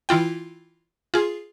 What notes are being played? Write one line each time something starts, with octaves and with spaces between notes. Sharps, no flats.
E3 E4 F4 G5
F4 G#4